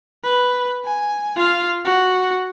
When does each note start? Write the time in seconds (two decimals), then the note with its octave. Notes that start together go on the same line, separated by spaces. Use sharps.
0.24 B4
0.84 G#5
1.36 F4 F5
1.84 F#4